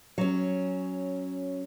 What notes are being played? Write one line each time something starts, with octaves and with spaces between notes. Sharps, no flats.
F#3 C#4